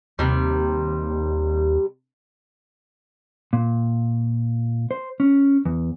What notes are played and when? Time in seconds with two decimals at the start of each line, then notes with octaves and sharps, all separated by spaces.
0.19 D#2 C3 G3
3.53 A#2
4.91 C5
5.20 C#4
5.65 E2